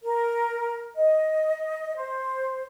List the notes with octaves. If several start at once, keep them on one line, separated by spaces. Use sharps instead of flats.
A#4
D#5
C5